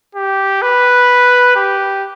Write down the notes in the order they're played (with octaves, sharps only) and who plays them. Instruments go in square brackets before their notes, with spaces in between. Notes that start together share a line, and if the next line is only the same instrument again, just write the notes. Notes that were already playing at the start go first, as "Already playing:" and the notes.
[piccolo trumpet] G4
B4
G4